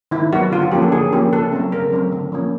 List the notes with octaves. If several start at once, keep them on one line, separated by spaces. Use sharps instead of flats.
D#3 E4
F#3 B3 F#4
D3 F4
F#4
F3 A#3 C#4 G4
A4
D3 G#4
F3 A#3 C#4 G4
C#3 A4
F#3 A3 C4
C#3 A#4
F#3 A3 C4
D3
F3 A#3 C#4